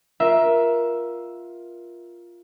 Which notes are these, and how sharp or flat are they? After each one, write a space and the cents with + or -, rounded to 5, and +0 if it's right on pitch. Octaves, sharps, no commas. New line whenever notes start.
F4 +0 A#4 +20 E5 +0